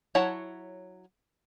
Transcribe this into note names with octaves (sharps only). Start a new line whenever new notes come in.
F#3 E4 C#5 F#5 A5